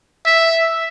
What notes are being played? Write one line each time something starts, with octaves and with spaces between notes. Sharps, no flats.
E5